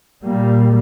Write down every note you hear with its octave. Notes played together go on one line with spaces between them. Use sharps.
A#2 G3 A#3